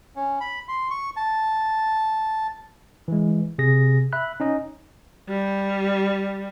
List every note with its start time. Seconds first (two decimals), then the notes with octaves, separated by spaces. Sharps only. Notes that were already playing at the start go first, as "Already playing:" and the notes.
0.16 C#4
0.41 B5
0.68 C6
0.90 C#6
1.16 A5
3.08 E3 G#3
3.58 C3 G#4 A#6
4.13 E5 B5 F#6
4.40 C#4 D#4 D#5
5.29 G3